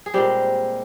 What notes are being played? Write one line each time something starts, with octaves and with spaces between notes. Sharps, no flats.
G#4
A#2 G3 G#3 C4 G4